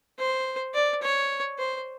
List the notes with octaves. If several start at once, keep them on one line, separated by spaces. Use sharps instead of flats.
C5
D5
C#5
C5